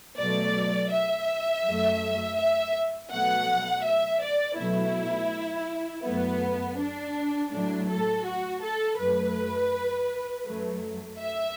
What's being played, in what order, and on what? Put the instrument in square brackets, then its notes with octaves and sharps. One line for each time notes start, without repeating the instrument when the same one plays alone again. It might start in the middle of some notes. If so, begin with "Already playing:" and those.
[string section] B2 F#3 A3 D5
E5
F#2 F#3 A3
E5
B2 F#3 A3 F#5
E5
D5
B2 F#3 A3 E4
F#2 F#3 A3 B3
D4
A2 F#3 A3 D4
A4
F#4
A4
F#2 F#3 A3 B4
F#2 F#3 A3
E5